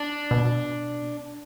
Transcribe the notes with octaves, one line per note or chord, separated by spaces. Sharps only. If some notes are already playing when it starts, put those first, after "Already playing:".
Already playing: D4
B2